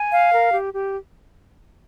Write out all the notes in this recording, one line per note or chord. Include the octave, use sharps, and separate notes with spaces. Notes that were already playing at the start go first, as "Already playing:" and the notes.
Already playing: G#5
F5
A#4
G4
G4